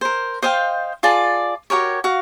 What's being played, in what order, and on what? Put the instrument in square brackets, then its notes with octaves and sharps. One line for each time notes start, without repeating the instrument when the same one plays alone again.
[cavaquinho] A#4 C5
C5 D#5 F5 G5
F4 G#4 D5 A5
F#4 G4 A#4 C#5
F#4 F5